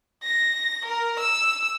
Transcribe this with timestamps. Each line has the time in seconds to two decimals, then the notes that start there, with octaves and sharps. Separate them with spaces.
0.24 A#6
0.85 A#4
1.19 E6